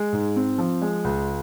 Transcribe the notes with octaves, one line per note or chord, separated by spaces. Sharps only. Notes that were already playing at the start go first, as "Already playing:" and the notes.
Already playing: G#3
G#2
C4
F3
G#3
C#2